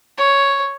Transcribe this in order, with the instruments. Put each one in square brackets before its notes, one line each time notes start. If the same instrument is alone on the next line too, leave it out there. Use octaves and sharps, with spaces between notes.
[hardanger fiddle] C#5